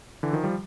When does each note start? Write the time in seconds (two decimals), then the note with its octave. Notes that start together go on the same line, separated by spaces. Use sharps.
0.23 D3 E3
0.33 D#3 F3
0.43 F3 G3